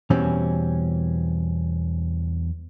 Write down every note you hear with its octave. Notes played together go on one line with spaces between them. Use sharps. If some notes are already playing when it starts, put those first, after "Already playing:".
E2 B2 E3 G3 C4 C#4